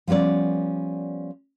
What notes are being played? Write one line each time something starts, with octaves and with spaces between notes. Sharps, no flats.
F3 G3 B3 C#4 D5